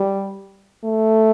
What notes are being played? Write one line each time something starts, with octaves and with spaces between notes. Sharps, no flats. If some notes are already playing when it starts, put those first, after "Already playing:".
Already playing: G3
A3